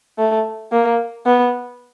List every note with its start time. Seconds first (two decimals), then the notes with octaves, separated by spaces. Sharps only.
0.18 A3
0.72 A#3
1.26 B3